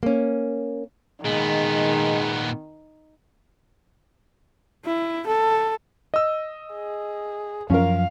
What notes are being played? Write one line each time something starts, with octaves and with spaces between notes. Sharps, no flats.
A#3 C#4
A#2 D#3 G#3 B3
E4
A4
D#5 E6
G#4
F#2 F3 C#4 A#4 F5